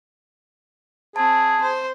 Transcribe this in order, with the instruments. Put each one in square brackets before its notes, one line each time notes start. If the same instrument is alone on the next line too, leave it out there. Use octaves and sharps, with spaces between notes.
[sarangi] C4 [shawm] G#4 [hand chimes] A5
[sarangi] C5